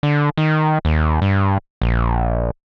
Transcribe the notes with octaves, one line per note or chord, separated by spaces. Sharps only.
D3
D#3
D#2
G2
A#1